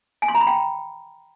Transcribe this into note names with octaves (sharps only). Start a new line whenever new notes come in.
G#5
C6
A#5
B5
G5